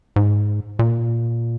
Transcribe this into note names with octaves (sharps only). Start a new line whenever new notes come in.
G#2
A#2